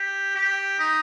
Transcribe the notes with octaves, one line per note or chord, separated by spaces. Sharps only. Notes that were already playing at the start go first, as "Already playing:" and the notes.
Already playing: G4
G4
D#4